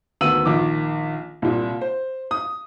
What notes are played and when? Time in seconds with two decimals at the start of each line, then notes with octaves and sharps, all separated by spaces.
0.21 D2 D#3 B3 E6 D#7 F#7
0.45 A#1 D#3 D6
1.42 C2 A#2
1.81 C5
2.31 D#6